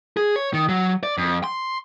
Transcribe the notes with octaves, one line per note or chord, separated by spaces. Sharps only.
G#4
C#5
D#3
F#3
D5
F2
C6